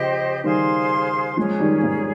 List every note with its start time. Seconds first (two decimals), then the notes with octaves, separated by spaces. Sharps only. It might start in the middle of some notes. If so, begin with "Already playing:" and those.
Already playing: C#3 F3 G4 C5 D#5 G5
0.44 D#3 G3 G#4 C5 F5 C6
1.37 F3 G#3 C#4 G#4 C#5
1.60 D#3 G3
1.83 G#2